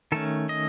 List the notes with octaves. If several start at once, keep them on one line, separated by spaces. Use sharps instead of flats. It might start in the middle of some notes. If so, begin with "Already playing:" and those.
D#3 A3 C#4 A4
D#5